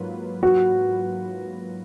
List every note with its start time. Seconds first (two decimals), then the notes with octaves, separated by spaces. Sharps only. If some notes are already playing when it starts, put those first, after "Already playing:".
Already playing: G#2 F#3 A#3 F4 B4
0.43 F#4